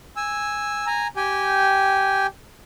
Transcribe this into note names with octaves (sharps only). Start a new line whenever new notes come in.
G#5 E6
G#5 A#5
G4 G5 G#5